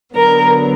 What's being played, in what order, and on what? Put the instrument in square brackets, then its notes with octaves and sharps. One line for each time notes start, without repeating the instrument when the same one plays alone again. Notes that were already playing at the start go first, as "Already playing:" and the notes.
[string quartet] D3 F#3 B3 A#4